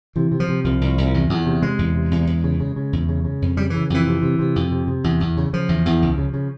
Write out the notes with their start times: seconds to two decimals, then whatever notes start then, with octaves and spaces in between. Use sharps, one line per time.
0.16 C3 E3
0.31 C3
0.40 F3
0.49 C3
0.64 C2 F3
0.81 C2
0.98 C2
1.14 E2
1.29 E2
1.46 C3
1.62 C3 G#3
1.79 E2
1.95 C3
2.11 E2
2.27 E2
2.44 C#3
2.60 C#3
2.76 C#3
2.93 E2
3.09 C#3
3.24 C#3
3.42 F2
3.57 C#3 G3
3.70 C#3 E3
3.90 F2 E3
4.06 C3
4.22 C3
4.39 C3
4.56 F2
4.72 C3
4.88 C3
5.04 E2
5.20 E2
5.37 C#3
5.53 C#3 F3
5.69 E2
5.85 E2
6.02 C#2
6.17 C#3
6.34 C#3